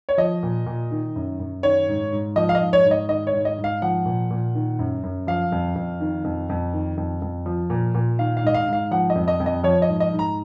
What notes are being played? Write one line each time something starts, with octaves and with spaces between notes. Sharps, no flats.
C#5
F3 D#5
A#2
A#2
D#3
F#2
F#2
D#3 C#5
G#2
G#2
F3 D#5
F5
D#5
G#2
C#5
G#2
D#5
D#3 D#5
C#5
G#2
D#5
G#2
F5
F3 F#5
A#2
A#2
D#3
F#2
F#2
F3 F5
F2
F2
D#3
F2
F2
D#3
F2
F2
F3
A#2
A#2
D#3 F5
F5
G#2 D#5
F5
G#2
F5
F3 F#5
D#5
F2
D#5
F2
D#5
F3 C#5
D#5
G#2
D#5
G#2
A#5